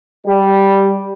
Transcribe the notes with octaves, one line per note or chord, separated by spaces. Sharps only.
G3